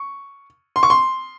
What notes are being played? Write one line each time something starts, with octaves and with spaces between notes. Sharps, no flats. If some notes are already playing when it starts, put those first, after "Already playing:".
Already playing: C#6
C6
C#6
C6